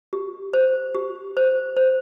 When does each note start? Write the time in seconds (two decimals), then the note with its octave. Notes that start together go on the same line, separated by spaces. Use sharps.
0.13 G4
0.53 C5
0.95 G4
1.37 C5
1.76 C5